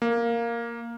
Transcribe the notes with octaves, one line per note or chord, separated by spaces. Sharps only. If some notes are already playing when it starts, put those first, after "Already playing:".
A#3